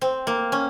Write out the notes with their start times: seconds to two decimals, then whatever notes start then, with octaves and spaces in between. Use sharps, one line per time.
0.01 C4
0.27 A#3
0.52 C#4